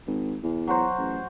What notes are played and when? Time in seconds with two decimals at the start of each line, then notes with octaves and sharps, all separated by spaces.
0.07 G#1
0.43 E2
0.67 F#3 F#4 C5
0.98 A1